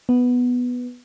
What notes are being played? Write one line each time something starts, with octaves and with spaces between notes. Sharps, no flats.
B3